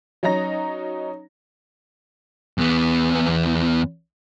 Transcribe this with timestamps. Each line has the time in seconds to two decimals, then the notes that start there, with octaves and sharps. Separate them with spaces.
0.23 F#3 C#4 D#4 A#5 A#6
2.58 E2 B3